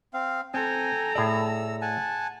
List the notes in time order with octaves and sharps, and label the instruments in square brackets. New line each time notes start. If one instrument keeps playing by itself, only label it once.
[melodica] C4 F5
[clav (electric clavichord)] C4 [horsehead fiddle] A4 A#5 [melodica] G5 G#5
[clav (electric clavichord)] A2 G#4 D5 [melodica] E6
[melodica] F#5 G#5 A5